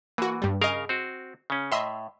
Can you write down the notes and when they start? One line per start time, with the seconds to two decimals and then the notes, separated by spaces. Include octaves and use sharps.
0.18 E3 A#3 F#4
0.42 G2 G3
0.61 C#3 G#4 A#4 D#5 F5
0.89 C4 F#4
1.50 C#3 C#4
1.72 A2 D#5 E5 C6